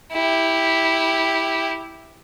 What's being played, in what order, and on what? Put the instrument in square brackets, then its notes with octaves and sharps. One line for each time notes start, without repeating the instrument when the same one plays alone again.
[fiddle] E4 G4